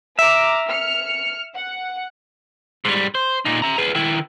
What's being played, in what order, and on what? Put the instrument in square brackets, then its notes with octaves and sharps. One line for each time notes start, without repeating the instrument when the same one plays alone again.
[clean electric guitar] E5 [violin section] A#5 D6 F6
[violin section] F6 C#7
F#5
[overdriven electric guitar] G#2 G3
C5
A#2 D#4
E5 A#5
G#4 B4
D#3 E4